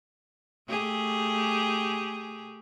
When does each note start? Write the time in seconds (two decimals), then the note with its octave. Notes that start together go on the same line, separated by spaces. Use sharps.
0.69 A3 G4 G#4